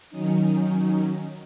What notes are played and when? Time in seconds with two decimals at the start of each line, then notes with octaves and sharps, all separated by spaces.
0.10 D#3 F#3 C#4 D#4